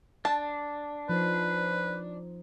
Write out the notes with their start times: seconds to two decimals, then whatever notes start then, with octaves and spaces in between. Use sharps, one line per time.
0.25 D4 A5
1.09 F3 D#4 B4 C5